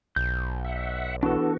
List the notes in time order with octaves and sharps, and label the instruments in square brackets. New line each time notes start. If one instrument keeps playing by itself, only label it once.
[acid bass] B1 [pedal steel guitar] G6
[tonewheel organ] E5 F#5
[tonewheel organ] E3 B3 F#4 [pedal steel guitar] D4 A4